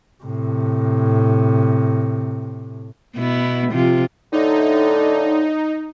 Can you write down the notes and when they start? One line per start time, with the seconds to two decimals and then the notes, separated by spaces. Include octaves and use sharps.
0.24 A2 C3
3.16 B2 B3 E4
3.72 C3 F3 F4
4.32 A2 D3 D#4